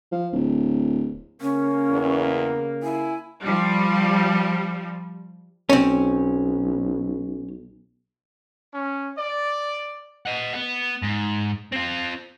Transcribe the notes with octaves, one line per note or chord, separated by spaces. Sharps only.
F3
D1
C#3 A#3 C#4
E2
E4 G#5
F3 G3
B1 C4 C#4
C#4
D5
D#5 F#5
B3
G#2
C4 F4